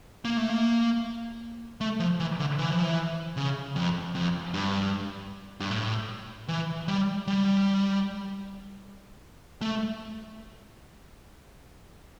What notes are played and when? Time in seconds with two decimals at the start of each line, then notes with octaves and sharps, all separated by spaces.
0.25 A#3
0.37 A3
0.49 A#3
1.81 A3
2.00 F3
2.20 E3
2.39 D3
2.58 E3
2.71 F3
2.82 E3
3.37 C#3
3.76 F2
4.15 F2
4.54 G2
5.60 G2
5.71 A2
6.48 E3
6.88 G3
7.27 G3
9.61 A3